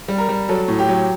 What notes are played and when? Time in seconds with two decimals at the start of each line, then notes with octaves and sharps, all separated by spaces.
0.08 G3
0.18 A#4
0.29 G3
0.49 F#3 A4
0.68 A2
0.79 G4
0.89 F#3